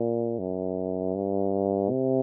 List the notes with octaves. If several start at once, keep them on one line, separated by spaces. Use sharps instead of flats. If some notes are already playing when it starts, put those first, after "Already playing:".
Already playing: A#2
F#2
G2
C3